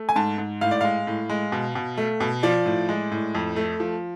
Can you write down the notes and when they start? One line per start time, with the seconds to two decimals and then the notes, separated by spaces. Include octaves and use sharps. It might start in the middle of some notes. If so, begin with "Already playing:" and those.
Already playing: A3
0.09 G#5
0.16 G#2 A5
0.38 G#2
0.61 A2 F5
0.71 D5
0.81 G#3 F5
1.07 A2
1.30 G#3
1.52 B2
1.75 B2
1.97 A3
2.20 B2
2.43 F3 D5
2.66 A2
2.89 G#3
3.12 A2
3.35 F2
3.56 A3
3.80 F3